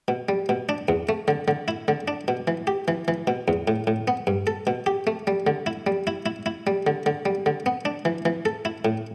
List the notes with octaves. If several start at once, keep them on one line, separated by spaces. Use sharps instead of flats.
B2
G3
B2
D4
E2
A3
D3
D3
E4
D3
D4
B2
E3
G4
E3
E3
B2
E2
A2
A2
B3
G2
A4
B2
G4
A3
G3
D3
E4
G3
E4
E4
E4
G3
D3
D3
G3
D3
B3
D4
E3
E3
A4
E4
A2